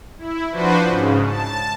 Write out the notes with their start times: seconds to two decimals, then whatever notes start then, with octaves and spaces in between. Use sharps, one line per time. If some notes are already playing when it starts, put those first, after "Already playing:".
0.18 E4
0.51 F3 D4 F#4 B4 C5
0.86 G#2 C#3
1.26 A5